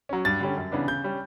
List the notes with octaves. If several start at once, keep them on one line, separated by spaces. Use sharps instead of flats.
F#3 C#4
G2 A6
D3 G3 C#4
F#2
C#3 E3 B3 D4
C#3 G6
G3 C#4